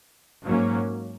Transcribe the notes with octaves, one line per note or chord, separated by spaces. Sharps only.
G#2 F#3 A#3 C#4